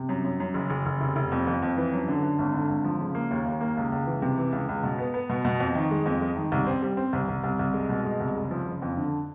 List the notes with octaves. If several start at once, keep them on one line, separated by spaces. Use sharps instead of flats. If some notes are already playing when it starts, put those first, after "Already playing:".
Already playing: C3
F#2
F#2
F#2
F#1
F#1
F#1
F1
F1
F2
F2
F2
E3
F#2
D3
D3
G#1
D3
G#1
F3
C#3
A#3
D#2
D#2
A#3
C#2
C#2
E3
C3
E3
C#2
C#2
B2
B3
B3
B2
B2
F2
D#3
G#3
F2
G#3
D#3
C2
C4
G3
C4
C2
C2
C2
C2
G#3
B2
G#3
C2
F#1
F3
F#1
F2
D3